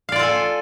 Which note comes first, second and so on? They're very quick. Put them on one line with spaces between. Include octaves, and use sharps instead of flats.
F5 D5 F4 A4 G#5